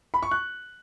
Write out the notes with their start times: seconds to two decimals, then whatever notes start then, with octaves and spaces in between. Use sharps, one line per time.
0.14 B5
0.23 C#6
0.31 F#6